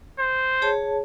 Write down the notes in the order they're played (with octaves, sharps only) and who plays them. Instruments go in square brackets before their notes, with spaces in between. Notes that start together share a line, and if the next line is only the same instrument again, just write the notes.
[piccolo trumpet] C5
[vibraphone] G#4 C#5 A5